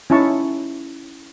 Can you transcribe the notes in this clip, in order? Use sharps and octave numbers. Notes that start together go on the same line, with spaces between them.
C#4 D#4 E4 A5 C#6